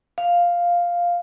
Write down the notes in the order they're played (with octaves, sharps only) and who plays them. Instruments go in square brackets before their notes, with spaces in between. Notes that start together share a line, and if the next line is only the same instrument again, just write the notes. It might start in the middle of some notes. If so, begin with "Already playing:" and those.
[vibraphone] F5